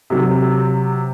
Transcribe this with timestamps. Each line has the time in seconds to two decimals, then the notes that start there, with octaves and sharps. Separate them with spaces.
0.10 C3 F#3